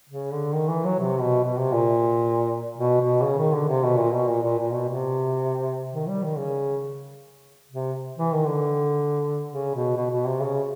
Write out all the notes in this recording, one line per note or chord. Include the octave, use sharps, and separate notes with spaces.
C#3
D3
D#3
E3
F#3
C3
B2
B2
C3
A#2
B2
B2
C#3
D#3
D3
C3
B2
A#2
B2
A#2
A#2
A#2
B2
C3
D#3
G3
D#3
C#3
C3
E3
D#3
D3
C#3
B2
B2
B2
C3
C#3